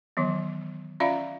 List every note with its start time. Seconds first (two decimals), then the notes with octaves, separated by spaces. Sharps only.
0.17 D#3 E3 F#3 B3
1.00 C#4 F4 D5 E5 F5 B5